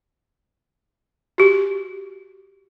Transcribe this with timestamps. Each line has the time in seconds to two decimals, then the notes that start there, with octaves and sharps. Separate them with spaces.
1.38 F#4 G4